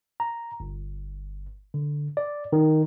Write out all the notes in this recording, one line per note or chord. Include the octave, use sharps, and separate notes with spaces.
A#5
G1
D3
D5
D#3